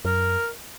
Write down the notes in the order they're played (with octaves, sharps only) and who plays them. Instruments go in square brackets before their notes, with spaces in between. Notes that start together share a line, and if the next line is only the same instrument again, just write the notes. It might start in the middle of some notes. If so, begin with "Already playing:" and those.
[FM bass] F#2 [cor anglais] A#4